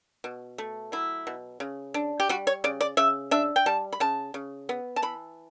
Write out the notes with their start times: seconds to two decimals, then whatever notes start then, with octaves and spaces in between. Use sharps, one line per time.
0.24 B2
0.58 A3
0.92 F#3 E4
1.27 B2
1.60 C#3
1.94 D4
2.20 G4
2.29 G3 F#4
2.47 C#5
2.64 C#3 D5
2.81 D5
2.97 C#3 E5
3.31 D4 E5
3.56 G5
3.66 G3 A5
3.92 B5
4.00 C#3 A5
4.34 C#3
4.69 B3
4.96 A5
5.02 E3 B5